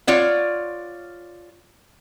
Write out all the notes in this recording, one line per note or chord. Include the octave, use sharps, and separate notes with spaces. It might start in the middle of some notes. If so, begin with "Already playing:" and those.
F4 C#5 D5 F#5